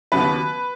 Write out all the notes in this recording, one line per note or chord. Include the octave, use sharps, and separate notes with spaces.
D#2 C#3 F#3 B3 B4